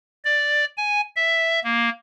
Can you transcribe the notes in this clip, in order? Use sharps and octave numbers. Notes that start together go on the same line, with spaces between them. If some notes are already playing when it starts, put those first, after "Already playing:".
D5
G#5
E5
A#3